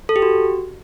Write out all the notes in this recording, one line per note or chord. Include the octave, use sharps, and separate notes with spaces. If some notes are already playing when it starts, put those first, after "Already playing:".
A4
G4
F#4